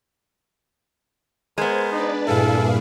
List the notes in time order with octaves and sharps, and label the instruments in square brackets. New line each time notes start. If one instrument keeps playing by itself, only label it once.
[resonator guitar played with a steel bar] G#3 B3 [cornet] A#4 [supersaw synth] C5
[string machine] D4 B4 D5 [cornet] D#4
[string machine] G2 A#2 [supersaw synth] E4 G#4 F5 [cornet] A4